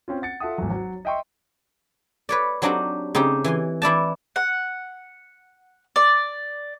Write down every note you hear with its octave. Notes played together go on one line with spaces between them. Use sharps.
C4 C#4 F4
F#5 A6 C#7
F4 A4 E5 F#5 D#6
G#1 E2 F#3
F#3 F#4
D#5 E5 G5 C6 C#6
B4 C#5 D5
F#3 C4 D4 D#4 F#4 G4
C#3 C4 D#4 G4
E3 G#5 C6
E3 E4 D5 A5
F#5
D5